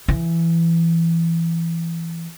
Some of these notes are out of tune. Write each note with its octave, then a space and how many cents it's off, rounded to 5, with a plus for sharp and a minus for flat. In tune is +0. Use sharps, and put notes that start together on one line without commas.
E3 +15